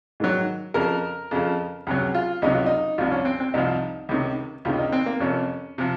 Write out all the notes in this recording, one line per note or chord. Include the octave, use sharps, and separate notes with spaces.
G#2 D#3 F#3
F2 C#3 F3 A#4
F2 C#3 F3
C#2 C3 F#3 G#4
F4
C#2 C3 F#3 D#4
F4
D#4
C2 C3 F3 F4
C#4
C4
C4
C2 C3 F3 D#4
C#2 C3 D#3
C#2 C3 D#3 F4
D#4
C4
A#3
F2 C3 F3 C#4
C3 F3